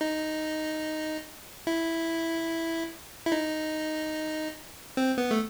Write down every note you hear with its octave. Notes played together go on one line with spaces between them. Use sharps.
D#4
E4
E4
D#4
C4
B3
A3